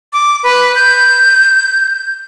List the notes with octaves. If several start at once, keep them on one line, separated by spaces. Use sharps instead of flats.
D6
B4
G6